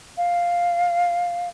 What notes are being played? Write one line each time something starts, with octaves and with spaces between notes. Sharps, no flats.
F5